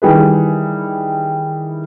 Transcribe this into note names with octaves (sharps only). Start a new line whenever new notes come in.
D#3 E3 G3 G#4 B4